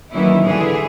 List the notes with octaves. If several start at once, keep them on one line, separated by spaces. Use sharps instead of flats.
D#3 E3 F#3 A#3 C#4 E4
D3 E3 G3 G#4